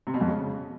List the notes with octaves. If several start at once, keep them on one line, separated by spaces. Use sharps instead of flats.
C3
B2
F2
C#3